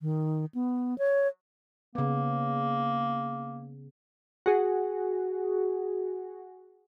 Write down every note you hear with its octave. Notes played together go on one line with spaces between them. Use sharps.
D#3
B3
C#5
C#3 A#3 B3
F#4 G#4